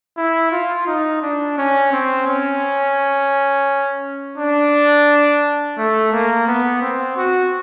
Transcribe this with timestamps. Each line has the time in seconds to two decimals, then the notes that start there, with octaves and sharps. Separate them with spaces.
0.17 E4
0.51 F4
0.87 D#4
1.22 D4
1.58 C#4
1.93 C4
2.27 C#4
4.38 D4
5.78 A3
6.12 A#3
6.47 B3
6.82 C4
7.17 F#4